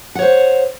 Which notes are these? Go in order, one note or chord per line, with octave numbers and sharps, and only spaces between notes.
C5 C#5 F#5